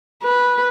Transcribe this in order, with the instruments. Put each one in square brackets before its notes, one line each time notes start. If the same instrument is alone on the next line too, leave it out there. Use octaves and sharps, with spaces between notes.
[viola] B4